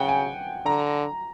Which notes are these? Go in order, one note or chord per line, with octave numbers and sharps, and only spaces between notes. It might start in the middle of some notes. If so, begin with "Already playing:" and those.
Already playing: C#3 F#5 G5
G#5
D3 A#5